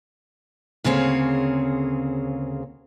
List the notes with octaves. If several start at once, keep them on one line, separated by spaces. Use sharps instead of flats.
D2 C#3 A#3 C4 G#4 C#5